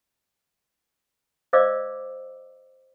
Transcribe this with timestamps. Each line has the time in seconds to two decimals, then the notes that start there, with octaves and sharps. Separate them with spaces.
1.53 C5 D5 D#5 F5 D6 E6